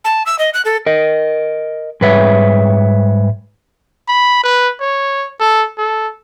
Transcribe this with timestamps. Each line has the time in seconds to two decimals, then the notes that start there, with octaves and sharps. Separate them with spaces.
0.05 A5
0.26 E6
0.39 D#5
0.54 F#6
0.65 A4
0.86 A#4 D#5
2.01 G#2 G3 B4 C#5 E5
4.08 B5
4.43 B4
4.81 C#5
5.40 A4
5.78 A4